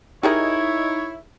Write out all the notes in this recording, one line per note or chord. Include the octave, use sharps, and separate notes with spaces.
D#4 E4 G4 G#4 A#4 C#5